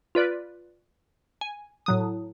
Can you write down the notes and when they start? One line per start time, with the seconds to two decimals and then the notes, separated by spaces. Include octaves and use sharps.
0.15 F4 B4 D5
1.41 G#5
1.86 A2 F#3 D#6